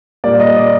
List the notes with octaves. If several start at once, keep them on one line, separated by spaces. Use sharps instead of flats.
A#2 G3 A#3 D5
D#5
D5